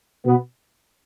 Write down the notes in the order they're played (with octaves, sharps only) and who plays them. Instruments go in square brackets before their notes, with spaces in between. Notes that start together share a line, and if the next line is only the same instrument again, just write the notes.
[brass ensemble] B2 B3